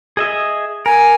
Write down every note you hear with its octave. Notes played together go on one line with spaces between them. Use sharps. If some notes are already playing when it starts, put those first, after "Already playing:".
G#4 D#5 E5
A#4 G#5